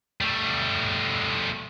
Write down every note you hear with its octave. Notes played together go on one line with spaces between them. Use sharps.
G3 A3